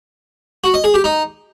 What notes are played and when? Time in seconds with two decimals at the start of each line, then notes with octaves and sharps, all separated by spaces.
0.64 F#4
0.74 D#5
0.84 G#4
0.94 G4
1.04 D#4